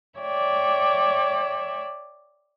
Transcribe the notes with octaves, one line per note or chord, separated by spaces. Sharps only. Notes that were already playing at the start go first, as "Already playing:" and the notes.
C#5 D5 E5 G5